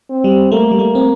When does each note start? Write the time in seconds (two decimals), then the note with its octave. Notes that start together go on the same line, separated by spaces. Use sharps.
0.10 C4
0.24 G3
0.52 A3 A#3
0.71 G3
0.79 A3
0.95 C4